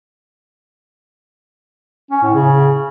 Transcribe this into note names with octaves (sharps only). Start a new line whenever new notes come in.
C#4
A2
C#3